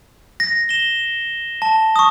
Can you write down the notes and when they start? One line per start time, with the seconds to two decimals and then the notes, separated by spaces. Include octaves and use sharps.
0.40 A#6
0.69 E7 G7
1.62 A5
1.96 C#6 D#6